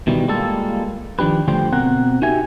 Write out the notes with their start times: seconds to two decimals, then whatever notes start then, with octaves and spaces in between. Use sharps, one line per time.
0.07 B2 D#3 E3 G3
0.28 G3 G#3 A#3 F4 A4
1.19 D#3 F3 D4 G4 B4
1.48 D2 D3 F3 G3 C5 G5
1.72 B2 C4 A#4 F#5
2.22 D#4 F#4 G4 E5 G#5